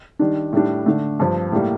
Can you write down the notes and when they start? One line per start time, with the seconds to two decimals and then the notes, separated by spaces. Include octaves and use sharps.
0.19 D#3 G3 D4
0.53 A2 G3 D4
0.86 D3 A3 D4
1.20 G2 F3 C4
1.52 A2 G3 A#3